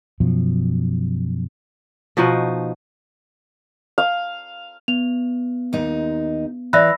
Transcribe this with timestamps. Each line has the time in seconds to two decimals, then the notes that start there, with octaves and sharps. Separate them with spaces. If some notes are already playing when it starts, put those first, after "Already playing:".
0.20 F#2 B2 F3
2.17 B2 F3 D#4 F#4
3.98 F5
4.88 B3 F7
5.73 D#2 D#4
6.73 E3 D5 E5 B5 E6 F#6 A#6